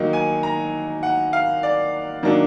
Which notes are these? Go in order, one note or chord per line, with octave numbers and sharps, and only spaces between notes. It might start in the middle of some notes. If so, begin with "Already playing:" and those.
Already playing: D#3 F#3 A#3 D#4
G#5
A#5
F#5
F5
D5
D#3 F#3 A#3 D4